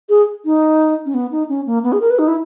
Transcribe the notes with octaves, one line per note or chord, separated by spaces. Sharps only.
G#4
D#4
C#4
B3
D#4
C#4
A#3
B3
G#4
A#4
B4
D#4
E4